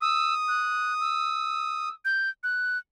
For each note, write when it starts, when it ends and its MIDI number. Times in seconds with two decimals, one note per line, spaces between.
0.02 1.89 87
0.02 0.34 88
0.48 0.94 90
1.01 1.94 88
2.05 2.30 91
2.43 2.78 90